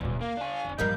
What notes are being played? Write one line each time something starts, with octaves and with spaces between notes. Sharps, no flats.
D1 E2 B2
C#3 A#3 F5
D4 G#5
F1 D2
A1 G2 F3 G3 A#3 D#4 G6